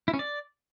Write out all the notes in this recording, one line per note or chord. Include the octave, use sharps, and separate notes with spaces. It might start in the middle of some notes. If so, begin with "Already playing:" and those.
E4
C#4
D5